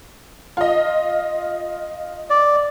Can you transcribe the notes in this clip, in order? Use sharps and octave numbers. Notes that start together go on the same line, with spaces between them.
F4 D#5
D5